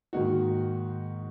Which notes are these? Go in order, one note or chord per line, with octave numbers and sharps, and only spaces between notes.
G#2 D#3 A#3 D#4 F#4